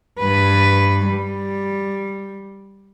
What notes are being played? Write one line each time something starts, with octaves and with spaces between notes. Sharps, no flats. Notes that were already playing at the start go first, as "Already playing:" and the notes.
G2 B4
G3